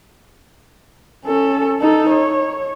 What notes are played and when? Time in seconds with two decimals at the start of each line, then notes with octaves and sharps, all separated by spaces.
1.26 C#4 A4
1.80 D#4 A4
2.10 C#5